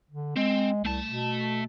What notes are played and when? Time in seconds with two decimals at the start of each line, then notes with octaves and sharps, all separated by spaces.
0.11 D3
0.36 G#3 C4
0.85 C2 A3 A5
1.07 B2